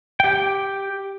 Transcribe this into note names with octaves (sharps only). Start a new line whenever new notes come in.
G4 G5